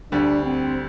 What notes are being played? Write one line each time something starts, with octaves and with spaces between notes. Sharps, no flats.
D2 D3 G3 D4
C4